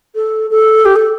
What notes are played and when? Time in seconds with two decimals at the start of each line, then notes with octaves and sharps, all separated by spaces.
0.15 A4
0.51 A4
0.85 G4
0.96 A4